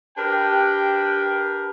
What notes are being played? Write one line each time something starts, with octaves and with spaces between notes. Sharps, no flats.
D4 G4 A#4 B4 G5